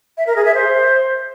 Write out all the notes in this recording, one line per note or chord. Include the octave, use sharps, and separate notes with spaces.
E5
A#4
G#4
E5
C5